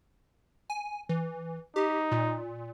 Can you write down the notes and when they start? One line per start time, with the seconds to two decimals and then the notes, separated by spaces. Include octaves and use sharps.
0.70 G#5
1.09 E3
1.76 D#4 G4
2.12 A#2